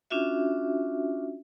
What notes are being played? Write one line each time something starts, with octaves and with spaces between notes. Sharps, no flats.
C#4 D4 F4 F#4 E5